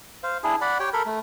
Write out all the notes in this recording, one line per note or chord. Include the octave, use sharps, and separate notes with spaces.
C5 F5
D4 E4 G#4
D5 F#5 B5
G4 C#5 G5
A4 A#4 B5
A3